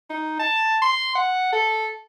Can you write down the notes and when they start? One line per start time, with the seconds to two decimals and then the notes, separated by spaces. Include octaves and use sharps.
0.10 D#4
0.39 A5
0.82 C6
1.15 F#5
1.53 A4